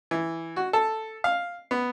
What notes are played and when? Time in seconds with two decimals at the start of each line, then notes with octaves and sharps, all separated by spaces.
0.11 E3
0.56 F#4
0.73 A4
1.24 F5
1.71 B3